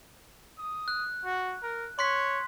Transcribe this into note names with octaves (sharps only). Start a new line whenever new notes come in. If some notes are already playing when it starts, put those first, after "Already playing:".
D#6
F#6
F#4
A#4
C#5 C6 F#6 B6